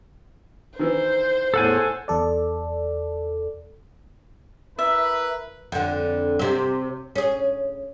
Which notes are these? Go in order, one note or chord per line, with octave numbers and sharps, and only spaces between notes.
D#3 E3 C5
E2 A2 A4 F#5 G#5
E2 A4 D5
E4 A#4 B4 E5
F2 D3
C3 C4
C#4 G#4